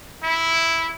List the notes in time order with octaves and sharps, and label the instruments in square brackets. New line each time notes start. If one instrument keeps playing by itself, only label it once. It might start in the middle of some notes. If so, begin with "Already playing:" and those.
[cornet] E4